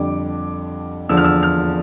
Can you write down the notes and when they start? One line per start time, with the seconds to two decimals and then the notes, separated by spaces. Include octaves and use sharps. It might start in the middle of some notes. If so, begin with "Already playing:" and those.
Already playing: F2 D3 G3 D6
1.09 E2 D3 F3 E6
1.17 F6
1.24 E6
1.43 F6